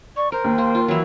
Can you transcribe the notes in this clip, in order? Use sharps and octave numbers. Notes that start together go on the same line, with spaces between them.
D5 C#6
A#4 C5 A#5
D#2
A#3 C6
F4
E3 F#3 E4